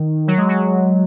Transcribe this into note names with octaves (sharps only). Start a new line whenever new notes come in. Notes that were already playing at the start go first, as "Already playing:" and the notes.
Already playing: D#3
F#3
G#3
F#3